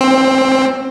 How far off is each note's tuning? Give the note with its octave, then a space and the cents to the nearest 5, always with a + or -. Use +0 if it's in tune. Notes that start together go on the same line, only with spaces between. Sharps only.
C4 +15